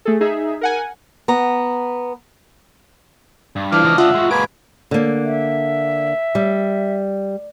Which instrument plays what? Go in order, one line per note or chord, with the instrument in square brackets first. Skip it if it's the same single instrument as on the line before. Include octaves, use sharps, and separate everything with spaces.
[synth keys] A3 G#4 A4
D#4 G#4 E5
A#4 F#5 G#5
[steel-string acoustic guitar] B3 A#5
[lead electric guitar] G2
[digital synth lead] E3 [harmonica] F3 D6 F6 [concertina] D4
[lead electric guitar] C#2 D#5
[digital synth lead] F4 [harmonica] E5 F#5
[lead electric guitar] G#3 F#4
[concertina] A#3 B4 G#5 [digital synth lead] D7
[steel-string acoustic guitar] D3 A#3
[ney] E5
[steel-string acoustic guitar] G3